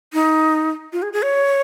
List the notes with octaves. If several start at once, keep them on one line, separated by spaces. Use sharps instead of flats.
D#4
F4
G#4
G#4
C#5